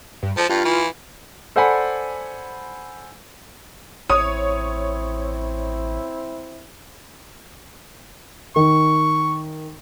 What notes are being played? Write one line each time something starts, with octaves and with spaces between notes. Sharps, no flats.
G2
F3 A5
G2 F4
E3
A4 C5 D5 F#5 G#5 B5
A1 C4 E4 C#5 D#6
D#3 C#6